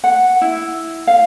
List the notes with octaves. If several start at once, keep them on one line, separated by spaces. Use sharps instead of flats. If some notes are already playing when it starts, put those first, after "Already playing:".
F#5
E4
F5